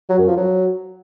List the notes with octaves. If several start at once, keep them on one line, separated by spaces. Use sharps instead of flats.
F#3
F#2
F3
F#3